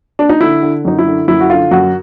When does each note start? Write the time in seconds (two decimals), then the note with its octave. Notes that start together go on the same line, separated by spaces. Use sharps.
0.19 D4
0.29 D#4
0.40 D3 E4
0.62 D3
0.85 F#2 D#4
0.99 E4
1.06 D3
1.28 F#2 E4
1.40 F#4
1.50 D3 F4
1.71 F#2 F#4